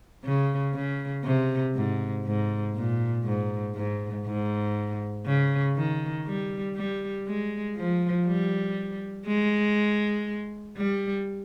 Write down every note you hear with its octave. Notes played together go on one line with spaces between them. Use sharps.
C#3
C#3
C3
G#2
G#2
A#2
G#2
G#2
G#2
C#3
D#3
G3
G3
G#3
F3
G3
G#3
G3